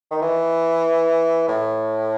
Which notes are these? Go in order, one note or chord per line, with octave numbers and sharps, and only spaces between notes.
D#3
E3
A2